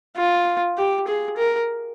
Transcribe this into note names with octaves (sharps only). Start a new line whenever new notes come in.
F4
G4
G#4
A#4